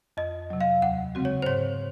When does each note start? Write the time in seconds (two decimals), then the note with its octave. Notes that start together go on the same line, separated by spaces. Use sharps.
0.17 F2 D#5
0.50 C3 F#3
0.61 F5
0.82 D#2 F#5
1.15 C#3 G#3 C4 F#4
1.25 C#5
1.42 C5
1.46 G#2 C#5